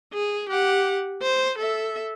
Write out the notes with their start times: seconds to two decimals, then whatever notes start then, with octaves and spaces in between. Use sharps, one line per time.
0.13 G#4
0.49 G4 F#5
1.22 C5
1.58 A4 E5